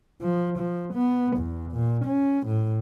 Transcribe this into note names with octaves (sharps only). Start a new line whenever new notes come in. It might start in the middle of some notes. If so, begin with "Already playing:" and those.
F3
F3
B3
E2
A#2
C#4
A2